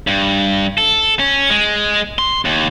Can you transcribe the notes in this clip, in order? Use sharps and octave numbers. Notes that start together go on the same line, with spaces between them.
G2
A4
C#4
G#3
C6
D#2